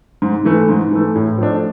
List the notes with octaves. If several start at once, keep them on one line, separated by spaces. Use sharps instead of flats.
G#2
E3 A3
G#2
E3 A3
A2
F3 A3 D4